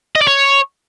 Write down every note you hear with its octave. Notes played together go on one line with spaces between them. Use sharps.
D#5
D5
C#5